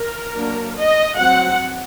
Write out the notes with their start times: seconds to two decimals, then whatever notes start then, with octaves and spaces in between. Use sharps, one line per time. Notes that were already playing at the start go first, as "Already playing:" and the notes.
Already playing: A#4
0.34 F#3 A#3 D4
0.76 D#5
1.18 F#3 C4 F#5